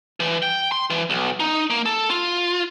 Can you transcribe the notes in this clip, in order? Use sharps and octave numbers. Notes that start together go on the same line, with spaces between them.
E3
G5
C6
E3
B1
D#4
A#3
A4
F4